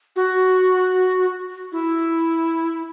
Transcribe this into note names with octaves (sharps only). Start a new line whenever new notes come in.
F#4
E4